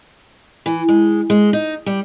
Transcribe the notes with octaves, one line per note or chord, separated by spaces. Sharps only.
E3
G#3
G#3
D#4
G3